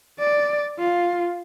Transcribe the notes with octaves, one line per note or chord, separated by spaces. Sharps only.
D5
F4